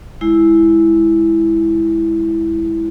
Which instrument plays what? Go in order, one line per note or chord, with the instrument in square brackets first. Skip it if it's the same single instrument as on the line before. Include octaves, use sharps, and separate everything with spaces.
[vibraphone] G#3 E4